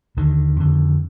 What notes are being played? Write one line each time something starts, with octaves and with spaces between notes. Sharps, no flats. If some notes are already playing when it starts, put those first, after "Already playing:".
D#2 D3 D#3
F2 D3